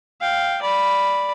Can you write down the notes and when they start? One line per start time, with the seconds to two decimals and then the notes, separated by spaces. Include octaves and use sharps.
0.21 F5 G5
0.61 D5 B5